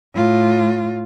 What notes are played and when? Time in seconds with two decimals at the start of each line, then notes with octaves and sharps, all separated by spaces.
0.15 A2 F4